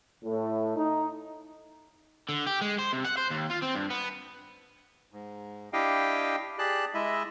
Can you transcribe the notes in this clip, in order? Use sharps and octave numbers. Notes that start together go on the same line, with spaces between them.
A2
D#4
D3
G4
G#3
C5
C3
F#5
C5
D#2
F4
C4
G2
B3
G#2
D4 E4 G4 D#5 F5 G5
G4 G#4 D5 A5 F#6
G#3 E4 D#5 E5